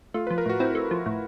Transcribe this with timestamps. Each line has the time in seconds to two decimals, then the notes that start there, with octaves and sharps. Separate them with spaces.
0.14 A3 F4
0.27 F3 B4
0.38 A#4
0.46 A2 F#4
0.60 C4 E4
0.75 A3
0.91 F3
1.06 A2